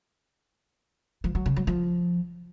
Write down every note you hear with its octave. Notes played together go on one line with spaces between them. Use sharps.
F3
F#3
C#3
F#3
F3